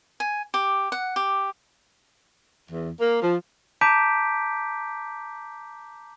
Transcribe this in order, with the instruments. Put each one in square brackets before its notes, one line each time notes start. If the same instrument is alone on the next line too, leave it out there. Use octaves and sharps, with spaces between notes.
[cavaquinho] G#5
G4
F#5
G4
[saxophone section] E2
A#3
F3
[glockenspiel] A5 A#5 D6 G6 B6 D7